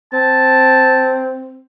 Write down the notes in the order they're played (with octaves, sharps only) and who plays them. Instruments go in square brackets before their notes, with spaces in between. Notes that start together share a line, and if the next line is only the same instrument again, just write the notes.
[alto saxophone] C4 [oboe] A5